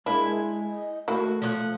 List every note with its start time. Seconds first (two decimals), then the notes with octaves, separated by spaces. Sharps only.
0.06 G#3 A#3 D4 E4 G#5
0.69 D#5
1.08 D#3 A3 A#3 E4 F#4
1.42 F3 C#5 F#5